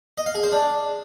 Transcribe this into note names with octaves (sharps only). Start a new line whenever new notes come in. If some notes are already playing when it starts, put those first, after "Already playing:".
D#5
F5
G#4
C5
D4